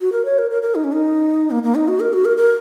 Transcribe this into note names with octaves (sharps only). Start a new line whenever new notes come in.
F#4
A#4
C#5
A#4
A#4
A#4
D#4
C#4
D#4
A#3
A#3
D#4
F#4
A#4
F#4
A#4
A#4